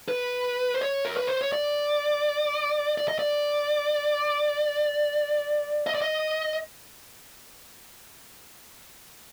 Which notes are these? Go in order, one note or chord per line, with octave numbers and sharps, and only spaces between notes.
B4
C5
C#5
A#4
B4
C5
C#5
D5
D5
D#5
D5
D#5
D5
D#5